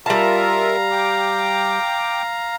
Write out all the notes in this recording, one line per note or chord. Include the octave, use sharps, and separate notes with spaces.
G3 F4 A#4 E5 F5 A5 A#5
G5 D6